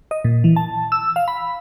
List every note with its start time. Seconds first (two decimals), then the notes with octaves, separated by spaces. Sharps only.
0.11 D#5
0.25 A#2
0.44 E3
0.56 A5
0.92 E6
1.16 F5
1.28 B5